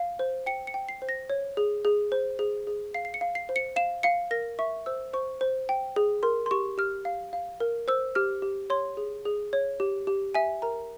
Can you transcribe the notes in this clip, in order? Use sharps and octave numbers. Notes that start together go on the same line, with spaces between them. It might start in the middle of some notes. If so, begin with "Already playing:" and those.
Already playing: F5
C5
G5 C#7
C#7
G5
C7
C5
A#6
C#5
G#4
G#4
C5
G#4
G#4
F5 C7
C7
C#7
F5
C7
C5
C#7
F5 E7
F5 C#7
A#4 A#6
E5 C#6
C5 E6
C5 C#6
C5
G5
G#4
A#4 C6
C6
G4 C#6
G4 F6
F5
F5
A#4
C5 E6
G4 F6
G4
C#5 C6
G#4
G#4
C#5
G4
G4
E5 G#5
A#4 A#5